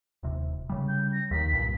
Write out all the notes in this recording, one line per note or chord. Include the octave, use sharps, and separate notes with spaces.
D#1 C3
C#3 G3
G6
A#6
D#2 D#3 B6
C2 G2 A#2